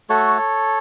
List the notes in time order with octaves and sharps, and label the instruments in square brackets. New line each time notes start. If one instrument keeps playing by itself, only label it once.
[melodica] A3 F#4 A4 C#5